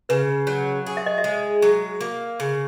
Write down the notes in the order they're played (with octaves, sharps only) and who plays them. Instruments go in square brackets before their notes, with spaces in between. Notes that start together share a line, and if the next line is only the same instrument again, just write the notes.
[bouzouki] C#3 [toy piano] B4
[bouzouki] F#3 [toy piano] C#5
[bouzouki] G#4
[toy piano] E5
D#5
E5
[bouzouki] G#3
F#3
A#3
C#3